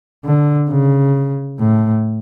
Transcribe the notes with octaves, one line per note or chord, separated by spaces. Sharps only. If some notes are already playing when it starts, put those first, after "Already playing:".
D3
C#3
A2